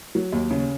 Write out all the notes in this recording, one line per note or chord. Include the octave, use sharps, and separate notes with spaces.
F#3
D#2
C#3